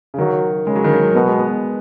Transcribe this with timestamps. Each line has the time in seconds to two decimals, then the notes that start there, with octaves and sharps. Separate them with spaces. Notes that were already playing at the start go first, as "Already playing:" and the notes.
0.14 C#3
0.18 D#3 F#3
0.67 C#3 G#3
0.76 F#3
0.84 D#3
0.93 F#3
1.15 B2 B3
1.27 G#3
1.39 B3